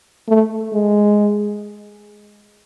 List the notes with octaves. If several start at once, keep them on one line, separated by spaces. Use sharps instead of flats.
A3
G#3